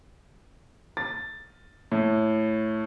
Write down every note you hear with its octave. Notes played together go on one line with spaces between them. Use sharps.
A6
A2